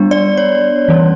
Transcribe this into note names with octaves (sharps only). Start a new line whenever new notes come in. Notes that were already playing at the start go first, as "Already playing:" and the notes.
Already playing: G3 B3 D4
D5
C#5
E3 G3 C#4